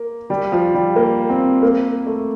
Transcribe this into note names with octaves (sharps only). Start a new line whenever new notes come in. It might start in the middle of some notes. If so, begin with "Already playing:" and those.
Already playing: A#3
G3
F3
G3
A#3
C4
A#3
A3